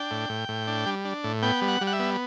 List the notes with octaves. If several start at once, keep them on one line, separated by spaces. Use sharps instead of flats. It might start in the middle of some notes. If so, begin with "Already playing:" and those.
Already playing: D4 G5
A2
A2
A2
D4
G3
D4
A2
B3 G5
G3
F#5
G3
F#5
E5
B3